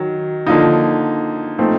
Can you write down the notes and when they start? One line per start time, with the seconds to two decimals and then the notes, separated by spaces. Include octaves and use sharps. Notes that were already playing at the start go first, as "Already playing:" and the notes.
Already playing: D#3 F#3
0.46 D3 F3 A#3 D#4
1.59 A#2 F3 A3 C4 D#4